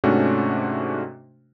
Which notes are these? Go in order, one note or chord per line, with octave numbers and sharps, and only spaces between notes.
G#2 C3 A3 C#4 D4 F#4